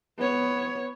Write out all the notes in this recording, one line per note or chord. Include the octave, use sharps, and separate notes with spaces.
B3 C#5